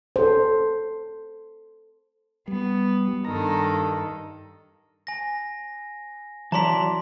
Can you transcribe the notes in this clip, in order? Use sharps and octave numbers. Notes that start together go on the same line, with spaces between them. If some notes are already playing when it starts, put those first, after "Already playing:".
A4 C5
G3 B3
G2 D#3 A4 A#5
G#5 A#6
E3 F#3 D5 A5 A#5 C6 B6